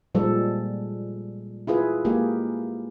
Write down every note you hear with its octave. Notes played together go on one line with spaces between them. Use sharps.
A#2 F3 G3 G#3 A4
E4 F4 G#4 B4
G#3 A#3 G4 G#4